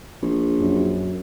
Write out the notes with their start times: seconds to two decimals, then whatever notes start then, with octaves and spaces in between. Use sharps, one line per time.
0.22 A#1
0.60 F#2